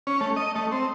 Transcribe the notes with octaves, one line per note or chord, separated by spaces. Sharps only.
C#4
A3
D#5
A3
C4